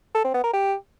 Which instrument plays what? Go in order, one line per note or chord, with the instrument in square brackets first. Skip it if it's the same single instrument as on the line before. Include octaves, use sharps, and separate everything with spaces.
[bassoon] A4
C4
B3
A#4
G4